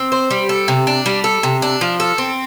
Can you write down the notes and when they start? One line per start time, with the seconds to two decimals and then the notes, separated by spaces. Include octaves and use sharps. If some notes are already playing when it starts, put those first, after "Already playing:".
Already playing: C4
0.12 C5
0.31 G3
0.49 A4
0.68 C3
0.87 D4
1.06 G3
1.24 A4
1.43 C3
1.62 D4
1.81 F3
2.00 A4
2.18 C4